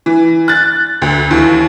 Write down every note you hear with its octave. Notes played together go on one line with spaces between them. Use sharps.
E3
F#6 A6
D2
D#2 E3